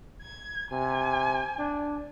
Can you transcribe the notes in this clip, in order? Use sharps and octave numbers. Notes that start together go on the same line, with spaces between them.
G#6
C3 G#5
D4